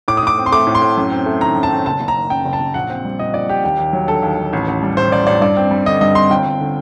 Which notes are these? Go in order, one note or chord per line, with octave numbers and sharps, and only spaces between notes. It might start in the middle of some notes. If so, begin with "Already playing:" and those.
A2 D6
D#6
A2 D6
C4
C6
A3 D6
A2
C6
A2
F#2
C4
A3
D#3 A#5
F#2
A5
C4
F#1 A5
F#1
A#5
D#3
F#2 G5
F#1
A5
F#1
A#1 F#5
C4
G3
A#2 D#5
A#1 D5
C4 G4
D#2 G4
D#2
F#3
D3 A4
D#2
D#2
A1
A1
G3
A2 C5
A1 D5
A1 D5
G2 D5
C4
G3
D3 D#5
G2 D#5
C4 C6
G1 G5
G1
D3